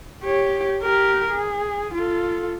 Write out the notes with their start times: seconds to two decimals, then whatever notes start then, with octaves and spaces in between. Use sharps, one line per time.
0.24 G4 C#5
0.82 G4 A#4
1.31 G#4
1.94 F4 A4